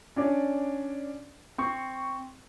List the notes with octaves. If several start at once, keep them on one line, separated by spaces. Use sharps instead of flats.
C#4 D4 D5
C4 C#6